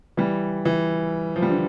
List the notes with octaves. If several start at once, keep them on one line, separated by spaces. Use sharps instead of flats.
E3 G3
E3
F3
G3
D3 F3